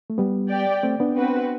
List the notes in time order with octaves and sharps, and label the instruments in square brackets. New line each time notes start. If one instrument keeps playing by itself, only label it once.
[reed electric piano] A3
G3 B3
[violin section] G4 D5 G5
[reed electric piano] A3 C4
B3 D4
[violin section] C4 F#4 B4